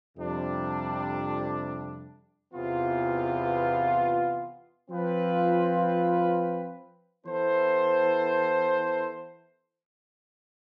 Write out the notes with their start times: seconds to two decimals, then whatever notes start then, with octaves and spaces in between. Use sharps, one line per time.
0.17 F2 C3 G3 D4
2.53 E2 C3 E3 B3 F4
4.89 F3 C4 F4 B4
7.26 E3 B3 E4 A4 C5